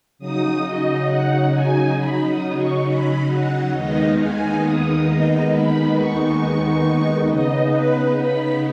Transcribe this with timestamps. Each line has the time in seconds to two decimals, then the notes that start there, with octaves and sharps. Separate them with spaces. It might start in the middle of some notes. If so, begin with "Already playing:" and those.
0.19 C#3 F#3 D#4 D#6
0.64 D#5
1.08 F#5
1.51 G#5
1.96 B5
2.25 D#6
2.55 C#6
2.85 B5
3.28 F#5
3.72 D#2 D#3 G#3 B3 D#4 D#5
4.16 G#5
4.62 D#6
5.06 D#5
5.50 B5
5.95 C#6
7.27 C#3 B3 D#4 D#5
7.70 B4
8.16 B5